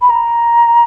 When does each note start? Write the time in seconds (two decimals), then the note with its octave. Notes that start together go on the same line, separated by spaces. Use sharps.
0.02 B5
0.10 A#5